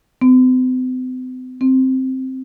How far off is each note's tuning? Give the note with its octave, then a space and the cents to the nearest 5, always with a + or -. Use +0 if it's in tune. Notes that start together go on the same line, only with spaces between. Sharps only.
C4 -45
C4 +0